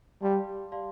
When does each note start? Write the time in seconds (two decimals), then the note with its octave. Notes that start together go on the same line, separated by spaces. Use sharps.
0.22 G3 G4 D5 F5 A5 C6
0.72 G4 D5 F5 A5 C6